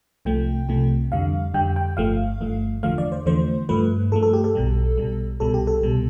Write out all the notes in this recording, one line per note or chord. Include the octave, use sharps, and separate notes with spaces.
C2 C3 F3 A3 G5
C2 C3 F3 A3
F2 D3 G3 F5
F2 D3 G3 G5
G5
G1 G2 F3 A3 F5
G1 G2 F3 A3
E2 D3 F3 A3 F5
D5
C5
E2 D3 F3 A3 C5
G2 F3 A3 B4
G2 F3 A3 A4
A4
G4
A4
B1 B2 G3
B1 B2 G3
C2 B2 G3 A4
G4
A4
C2 B2 G3